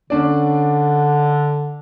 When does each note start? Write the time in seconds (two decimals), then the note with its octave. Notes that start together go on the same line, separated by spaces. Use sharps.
0.10 D3 C#4 D4 D5